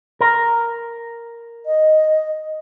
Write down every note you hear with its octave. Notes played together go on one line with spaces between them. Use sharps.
A#4
D#5